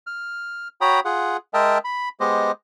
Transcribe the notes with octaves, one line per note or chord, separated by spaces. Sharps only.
F6
F#4 C#5 G5 A#5 B5 D#6
F4 G#4 F#5
G#3 A#4 D#5 E5 G5 A5
B5
G#3 B3 G4 C5 D#5